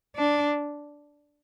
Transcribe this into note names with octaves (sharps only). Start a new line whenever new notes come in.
D4